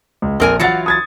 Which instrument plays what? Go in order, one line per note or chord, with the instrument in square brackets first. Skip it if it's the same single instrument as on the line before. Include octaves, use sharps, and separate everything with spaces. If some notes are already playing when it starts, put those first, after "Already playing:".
[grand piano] C#2
[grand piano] A#1 [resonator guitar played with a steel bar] C4 A#4 G#5
[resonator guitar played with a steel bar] E3 F#3 F4 [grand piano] F#5 A6 C#7
[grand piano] D#6 G#6 A6